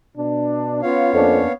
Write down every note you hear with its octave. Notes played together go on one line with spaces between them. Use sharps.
B2 D4
B3 C#4 F4 C#5 F5
F2 A#3 C#4 D4